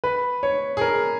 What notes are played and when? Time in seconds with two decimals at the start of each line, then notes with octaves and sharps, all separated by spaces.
0.04 B4
0.43 C#5
0.77 G#4
0.81 A#4